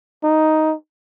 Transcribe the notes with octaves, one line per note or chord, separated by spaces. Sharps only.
D#4